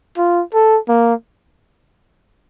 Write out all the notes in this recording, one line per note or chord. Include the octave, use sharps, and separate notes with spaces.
F4
A4
A#3